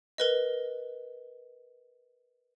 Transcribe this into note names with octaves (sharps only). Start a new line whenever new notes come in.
A#4 B4 D#5